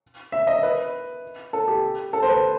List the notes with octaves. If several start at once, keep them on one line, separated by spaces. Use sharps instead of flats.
E5
D#5
B4
A4
G4
A4
C5
B4